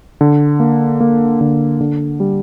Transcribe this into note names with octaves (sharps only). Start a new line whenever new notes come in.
D3
A#3
A#3
D3
D3
G3